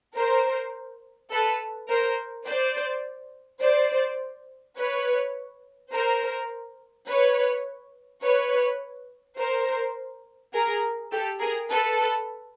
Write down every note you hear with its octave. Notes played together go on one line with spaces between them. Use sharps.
A#4 C5
A4 B4
A#4 C5
C5 D5
C5 D5
B4 C#5
A#4 C5
B4 C#5
B4 C#5
A#4 C5
G#4 A#4
G4 A4
G#4 A#4
A4 B4